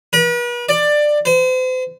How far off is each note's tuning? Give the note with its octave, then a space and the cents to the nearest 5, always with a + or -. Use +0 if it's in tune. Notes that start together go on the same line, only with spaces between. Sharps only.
B4 -40
D5 +15
C5 -40